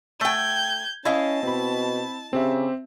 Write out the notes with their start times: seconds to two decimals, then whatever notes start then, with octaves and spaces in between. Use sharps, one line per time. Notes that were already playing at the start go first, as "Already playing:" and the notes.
0.21 A3 G5 G6 G#6
1.05 C#4 E4 D#5 F5 A5
1.43 B2 C4 B5
2.33 C#3 C4 G4 E5